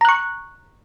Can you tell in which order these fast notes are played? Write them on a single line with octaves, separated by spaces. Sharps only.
A#5 F#6 C#6